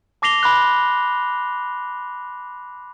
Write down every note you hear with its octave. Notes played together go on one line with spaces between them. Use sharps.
A5 D6 A#6 C7 F7 G7
B5 C6 F#6